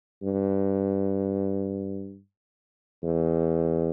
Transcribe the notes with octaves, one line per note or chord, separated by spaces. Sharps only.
G2
E2